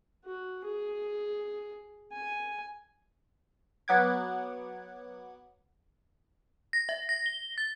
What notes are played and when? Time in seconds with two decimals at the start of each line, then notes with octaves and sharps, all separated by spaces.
0.25 F#4
0.64 G#4
2.12 G#5
3.88 F#3 B3 F#5 D6 G#6
6.73 A#6
6.89 E5
7.09 A#6
7.26 G7
7.58 A6